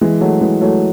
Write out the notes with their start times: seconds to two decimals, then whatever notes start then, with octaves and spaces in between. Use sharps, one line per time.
0.01 E3 G#3
0.21 F#3 A3
0.41 E3 G#3
0.61 F#3 A3